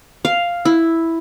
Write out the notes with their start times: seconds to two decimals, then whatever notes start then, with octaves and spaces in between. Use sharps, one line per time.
0.25 F5
0.65 E4